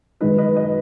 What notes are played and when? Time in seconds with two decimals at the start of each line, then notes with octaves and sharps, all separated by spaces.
0.21 F#2 D#3 G#3 D#4 B4 D#5
0.38 B4 D#5
0.56 B4 D#5